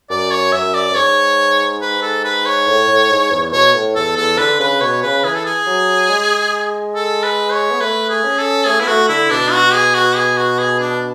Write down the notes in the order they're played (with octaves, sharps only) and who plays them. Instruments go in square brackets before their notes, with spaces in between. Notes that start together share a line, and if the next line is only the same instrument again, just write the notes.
[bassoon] F#2 [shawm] D5
[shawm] C#5
[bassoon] F#2 [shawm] E5
[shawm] D5
[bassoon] F#2
[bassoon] G#2 [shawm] C#5
[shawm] B4
A4
B4
C#5
[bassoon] A2
A2
G#2
E2
[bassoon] B2 [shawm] C#5
[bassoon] A2
[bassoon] E2 [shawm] A4
[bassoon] E2 [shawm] A4
[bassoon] D3 [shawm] B4
[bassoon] C#3 [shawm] B4
[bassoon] B2 [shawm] C#5
[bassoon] C#3 [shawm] B4
[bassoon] E3 [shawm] G#4
[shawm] A4
G#4
[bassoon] F#3
G#3
[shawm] A4
B4
C#5
[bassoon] B3
[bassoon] A3 [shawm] B4
[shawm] G#4
[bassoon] C#4
[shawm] A4
[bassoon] A3 [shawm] G#4
[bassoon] B3 [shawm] E4
[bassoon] A3 [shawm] F#4
[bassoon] D3 [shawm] E4
[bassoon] B2 [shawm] D4
[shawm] F#4
G#4
F#4
G#4
F#4
G#4
D4